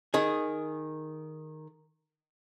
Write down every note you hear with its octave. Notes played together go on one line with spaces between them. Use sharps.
D#3 G#4